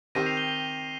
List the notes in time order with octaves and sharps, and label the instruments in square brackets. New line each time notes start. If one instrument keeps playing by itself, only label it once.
[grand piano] D#3 C4 G4 [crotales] A#6 D#7
[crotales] C7 F7
D#7 G7
D#7 G7